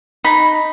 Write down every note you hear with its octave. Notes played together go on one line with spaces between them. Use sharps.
D#4 B5